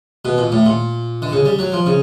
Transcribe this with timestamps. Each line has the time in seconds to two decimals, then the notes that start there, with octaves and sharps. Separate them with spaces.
0.25 B2
0.38 A#2
0.52 A2
0.66 A#2
1.22 D3
1.32 C#3
1.45 G3
1.59 F#3
1.72 F3
1.86 C#3